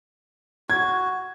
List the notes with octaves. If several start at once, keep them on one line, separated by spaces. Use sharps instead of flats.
F#4 G#6